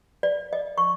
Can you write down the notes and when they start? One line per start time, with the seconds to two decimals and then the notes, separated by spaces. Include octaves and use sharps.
0.23 D5
0.53 D#5
0.78 C#6